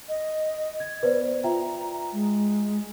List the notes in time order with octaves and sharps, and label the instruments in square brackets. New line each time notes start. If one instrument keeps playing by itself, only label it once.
[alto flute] D#5
[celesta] G#6
[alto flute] B3 [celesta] B4 C5 D5
[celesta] F4 E5 G5 [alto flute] A#5
[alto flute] G#3